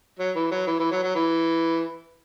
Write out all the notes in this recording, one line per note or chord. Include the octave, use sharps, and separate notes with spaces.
F#3
E3
F#3
E3
E3
F#3
F#3
E3